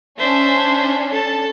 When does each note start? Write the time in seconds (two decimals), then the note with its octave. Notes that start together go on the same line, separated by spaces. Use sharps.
0.19 C#4 D4 C5 E5
1.12 A4 A5